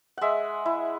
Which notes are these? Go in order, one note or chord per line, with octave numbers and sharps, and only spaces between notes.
G#3 E5 F#5
E4